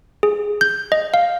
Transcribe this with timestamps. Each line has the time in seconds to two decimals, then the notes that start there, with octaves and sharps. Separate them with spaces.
0.23 G#4
0.61 G6
0.92 D#5
1.14 F5